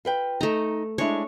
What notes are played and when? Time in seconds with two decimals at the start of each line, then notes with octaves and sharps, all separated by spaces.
0.05 F4 B4 G5
0.41 A3 D#4 A#5
0.98 G#3 D4 E4 C#5